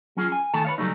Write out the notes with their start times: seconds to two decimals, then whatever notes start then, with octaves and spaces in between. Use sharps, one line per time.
0.17 F#3 C#4 F4 G#4
0.32 G#5
0.53 D#3 A3 A4 A5
0.65 B4 C#5 F5
0.78 C#3 F#3 G3 A3 D#4